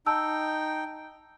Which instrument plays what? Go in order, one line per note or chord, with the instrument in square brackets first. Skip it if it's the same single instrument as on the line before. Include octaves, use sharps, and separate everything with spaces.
[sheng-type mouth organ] D#4 G5 [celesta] A5 E6